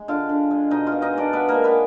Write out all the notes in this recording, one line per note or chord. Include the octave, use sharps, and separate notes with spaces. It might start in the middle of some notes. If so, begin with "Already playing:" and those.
Already playing: G#3
D3 F4 F5
D3
G#3
B2 D#4 D#5
F4 F5
B2
D#4 D#5
G#3 D4 D5
G#3 B3 B4
A#3 A#4
G#3
B3 B4